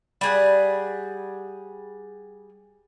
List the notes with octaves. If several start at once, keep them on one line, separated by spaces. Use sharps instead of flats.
G3 G#4 F#5